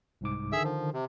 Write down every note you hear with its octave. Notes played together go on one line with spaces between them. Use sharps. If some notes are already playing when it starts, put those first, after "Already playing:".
C2 G#2 D6
D3 D#3 G#4 E5 E6
F3
C3